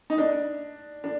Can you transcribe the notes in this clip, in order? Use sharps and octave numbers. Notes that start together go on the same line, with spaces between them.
D#4
D4
D4